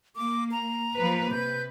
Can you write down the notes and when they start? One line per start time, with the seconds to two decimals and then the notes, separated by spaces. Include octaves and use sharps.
0.16 A#3 D6
0.52 A#5
0.95 F3 A#3 B4
1.31 C3 B4 G6